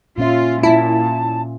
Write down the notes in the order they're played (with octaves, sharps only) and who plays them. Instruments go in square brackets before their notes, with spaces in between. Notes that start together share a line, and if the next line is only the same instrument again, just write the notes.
[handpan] A#2 C#4 E5 [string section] F4
[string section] A#2 [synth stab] E4 [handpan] F4 [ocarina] A5